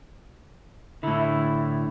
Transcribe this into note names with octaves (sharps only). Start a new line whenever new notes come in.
A2 D3 E4